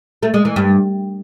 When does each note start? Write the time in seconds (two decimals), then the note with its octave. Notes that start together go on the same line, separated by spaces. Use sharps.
0.23 A3
0.34 G#3
0.45 E3
0.56 G2